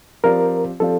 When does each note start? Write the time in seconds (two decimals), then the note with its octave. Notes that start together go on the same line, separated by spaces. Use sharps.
0.23 F3 C4 G4 A#4 D5 F5
0.80 F3 C4 G4 A4 D5 F5